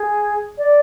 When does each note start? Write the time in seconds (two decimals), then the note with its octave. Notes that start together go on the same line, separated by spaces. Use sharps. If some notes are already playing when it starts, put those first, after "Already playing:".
Already playing: G#4
0.58 D5